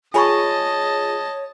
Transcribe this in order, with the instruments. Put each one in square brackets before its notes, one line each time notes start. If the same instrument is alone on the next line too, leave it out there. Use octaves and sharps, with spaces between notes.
[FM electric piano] F4 G#4 [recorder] C#5 [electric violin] D#5 A5 [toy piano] G#5 B5 C#6